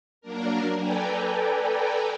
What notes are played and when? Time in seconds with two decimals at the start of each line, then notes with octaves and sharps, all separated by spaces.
0.21 F#3 A#3 D4 A#4
0.76 A4 B4 D5 G5 G#5 A#5